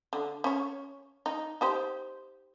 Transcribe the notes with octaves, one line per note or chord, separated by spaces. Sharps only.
D3
C#4 C#5
D#4
D#4 G4 C5